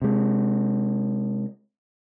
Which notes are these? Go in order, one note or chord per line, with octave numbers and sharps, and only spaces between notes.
C3 G#3